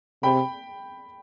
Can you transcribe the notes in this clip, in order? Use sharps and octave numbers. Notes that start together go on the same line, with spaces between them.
C3 G5 B5